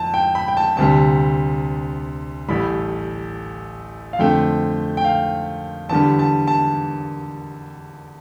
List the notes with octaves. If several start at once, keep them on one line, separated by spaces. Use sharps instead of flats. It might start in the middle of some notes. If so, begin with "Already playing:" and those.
Already playing: F2 A5
G5
B5
G5
A5
D2 C3 G3 A5
A1 A2 G3 B5
F5
F2 D3 A3 C4 G5
G5
F5
E2 D3 G3 A5
A5
A5